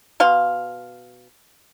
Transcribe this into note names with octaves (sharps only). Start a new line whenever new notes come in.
B2 F5 C6